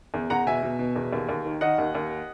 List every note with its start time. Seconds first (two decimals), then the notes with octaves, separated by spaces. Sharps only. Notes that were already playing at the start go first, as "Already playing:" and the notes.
0.14 E2
0.30 E2 F#5 A#5
0.47 B2 E5 G#5
0.63 B2
0.79 B2
0.96 E2
1.13 D#2
1.29 D#2
1.45 D#3
1.61 D#3 D#5 F#5
1.78 D#2
1.95 D#2